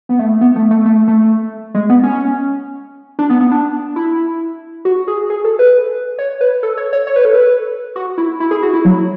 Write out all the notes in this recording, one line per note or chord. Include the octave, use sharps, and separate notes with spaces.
B3
A3
B3
A3
A3
A3
A3
G#3
B3
C#4
D4
B3
B3
D4
E4
F#4
G#4
G#4
A4
B4
C#5
B4
A4
C#5
C#5
C#5
B4
A4
B4
F#4
E4
E4
G#4
F#4
E4
F#3